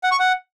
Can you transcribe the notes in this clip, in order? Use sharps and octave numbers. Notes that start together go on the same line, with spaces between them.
F#5
C#6
F#5